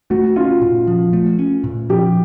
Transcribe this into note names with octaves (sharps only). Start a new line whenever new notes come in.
A3 F#4
C#4 F4
A#2
F3
A3
C#4
A#2
F3 G4